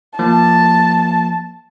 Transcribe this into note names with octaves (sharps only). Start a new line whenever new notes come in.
F3 A#3 A5